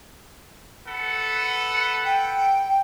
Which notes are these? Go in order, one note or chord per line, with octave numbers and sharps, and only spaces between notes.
A4 B4 F#5
G5